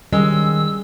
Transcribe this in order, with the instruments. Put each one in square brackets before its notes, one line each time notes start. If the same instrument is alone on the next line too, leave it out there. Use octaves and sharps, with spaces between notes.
[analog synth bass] D#3 [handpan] G3 C#4 G#4 [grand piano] G#3 [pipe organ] E6